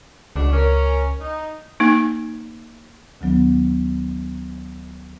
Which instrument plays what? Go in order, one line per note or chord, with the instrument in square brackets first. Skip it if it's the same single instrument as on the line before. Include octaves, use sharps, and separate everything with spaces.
[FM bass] C#2 [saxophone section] A3 D4 F#4
[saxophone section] C#4 A#4
D#4
[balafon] A#3 D#4
[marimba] D2 D#3 F#3 B3